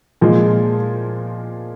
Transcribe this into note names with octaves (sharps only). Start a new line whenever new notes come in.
A#2 F3 G#3